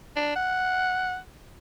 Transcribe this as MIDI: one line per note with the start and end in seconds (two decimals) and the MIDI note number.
0.16 0.31 62
0.36 1.16 78